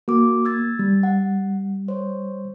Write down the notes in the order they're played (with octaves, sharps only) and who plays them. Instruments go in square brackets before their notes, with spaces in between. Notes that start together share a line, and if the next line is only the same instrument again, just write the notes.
[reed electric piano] A#3 [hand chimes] F#4 D6
[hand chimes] E6 G#6 A6
[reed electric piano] G3 [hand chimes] A6
[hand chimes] F#5
C5 C#5